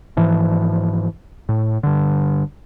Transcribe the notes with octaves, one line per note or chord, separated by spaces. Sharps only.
G#2 E3 F3
A2
G2 D3